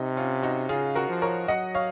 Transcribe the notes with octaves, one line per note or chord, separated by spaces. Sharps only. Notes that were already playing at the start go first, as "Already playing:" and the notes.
Already playing: C3 D#4
C#4 F4
D#4 F#4
C#3 F4 G#4
F#4 A#4
F3
A#4 C#5
F#3 D#5 F#5
C#5 F5